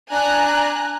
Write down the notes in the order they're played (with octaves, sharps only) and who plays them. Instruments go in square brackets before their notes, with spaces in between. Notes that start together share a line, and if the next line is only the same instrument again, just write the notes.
[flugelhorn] D4 [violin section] G#5 A#5 F#6